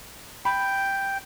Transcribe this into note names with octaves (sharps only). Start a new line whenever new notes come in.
G5 B5